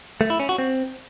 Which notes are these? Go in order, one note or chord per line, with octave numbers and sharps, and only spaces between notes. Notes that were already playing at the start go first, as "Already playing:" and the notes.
A3
E4
C#4
F#4
C4